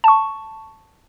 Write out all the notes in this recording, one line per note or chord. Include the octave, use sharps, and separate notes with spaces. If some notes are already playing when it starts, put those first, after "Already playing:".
A5 C#6